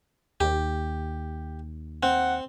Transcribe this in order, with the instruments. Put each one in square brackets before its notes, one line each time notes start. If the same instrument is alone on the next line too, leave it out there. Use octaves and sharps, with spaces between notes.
[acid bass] D#2 [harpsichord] G4
[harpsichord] C4 [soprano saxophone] F#5